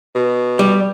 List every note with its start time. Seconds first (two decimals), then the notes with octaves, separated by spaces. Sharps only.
0.15 B2
0.59 G3